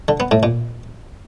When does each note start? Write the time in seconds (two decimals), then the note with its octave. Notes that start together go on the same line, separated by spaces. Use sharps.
0.08 D3
0.20 B3
0.31 A2
0.43 A#2